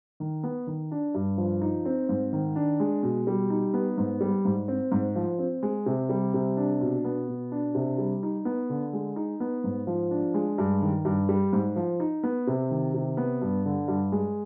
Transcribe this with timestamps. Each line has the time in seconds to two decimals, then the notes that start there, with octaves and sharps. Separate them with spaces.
0.20 D#3
0.43 B3
0.67 D#3
0.91 D4
1.15 G2
1.38 F3
1.61 D#4
1.85 C4
2.09 G#2
2.33 D#3
2.56 D4
2.80 G#3
3.03 B2
3.27 G3
3.50 D#4
3.74 B3
3.98 G#2
4.21 G3
4.45 G#2
4.68 C4
4.92 G#2
5.15 F3
5.39 C4
5.63 G#3
5.86 C3
6.09 G3
6.34 C3
6.57 D4
6.81 B2
7.05 B3
7.28 B2
7.52 D4
7.75 C3
7.98 G3
8.23 D#4
8.45 B3
8.70 D3
8.93 G#3
9.16 D#4
9.40 B3
9.64 G#2
9.87 F3
10.11 D4
10.34 G#3
10.58 G2
10.82 D#3
11.05 G2
11.29 G3
11.53 G#2
11.76 F3
12.00 D#4
12.23 B3
12.47 C3
12.71 D#3
12.94 C3
13.17 B3
13.41 G2
13.66 D3
13.88 G2
14.12 G#3